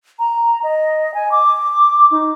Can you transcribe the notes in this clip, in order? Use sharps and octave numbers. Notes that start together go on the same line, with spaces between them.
A#5
D#5
G#5
D6
D#4